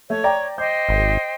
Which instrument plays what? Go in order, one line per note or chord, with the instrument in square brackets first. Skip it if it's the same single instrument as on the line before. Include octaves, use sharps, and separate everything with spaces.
[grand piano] A3 [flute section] C#5
[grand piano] D5 G5 A#5
[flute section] C5 D#5 G5 [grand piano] D6 G6
[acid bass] G#1